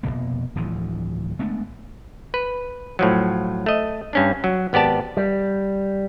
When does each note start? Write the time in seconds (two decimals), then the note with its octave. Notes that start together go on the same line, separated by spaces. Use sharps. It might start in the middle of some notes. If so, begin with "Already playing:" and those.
0.03 F1 E2 B2 A#3
0.55 D1 D2 E3 F3
1.39 G#3 A3 B3 D4
2.34 B4
2.99 A2 F3 F#3
3.66 A3 D#5
4.13 G2 C#4 D4
4.44 F#3
4.73 G#1 B3 G4 D5 A5
5.17 G3